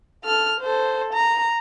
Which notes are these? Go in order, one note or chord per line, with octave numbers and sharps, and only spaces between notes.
A4 F6
A4 C5
A#5